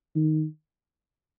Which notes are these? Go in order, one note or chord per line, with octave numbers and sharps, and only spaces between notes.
D#3